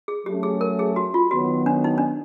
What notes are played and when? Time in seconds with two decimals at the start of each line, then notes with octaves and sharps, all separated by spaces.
0.08 G#4
0.25 F#3 A3 C#4 G4
0.43 G#4
0.61 A#4
0.79 G#4
0.96 F#4
1.14 F4
1.31 D#3 F#3 B3 F#4
1.66 D4
1.84 D#4
1.98 D4